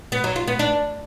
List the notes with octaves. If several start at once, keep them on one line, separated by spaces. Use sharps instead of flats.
B3
F#3
F4
B3
D4